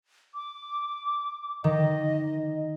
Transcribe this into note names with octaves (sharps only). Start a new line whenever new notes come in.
D6
D#3 D#5